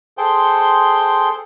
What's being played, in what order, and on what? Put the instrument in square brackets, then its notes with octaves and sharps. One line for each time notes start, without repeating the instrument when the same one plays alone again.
[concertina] G#4 A4 C5 G5 C6